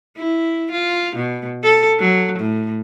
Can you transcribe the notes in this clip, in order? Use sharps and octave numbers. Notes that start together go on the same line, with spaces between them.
E4
F4
B2
A4
F#3
A2